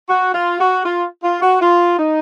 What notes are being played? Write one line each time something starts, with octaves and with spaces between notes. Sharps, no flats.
F#4
F4
F#4
F4
F4
F#4
F4
D#4